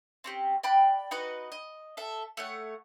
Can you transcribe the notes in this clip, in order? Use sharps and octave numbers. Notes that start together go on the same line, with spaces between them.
C4 C#4 G4
D5 G5 B5 F#6
D#4 F#4 B4 D#5
D#5
A4 E5
A3 C#5 F#5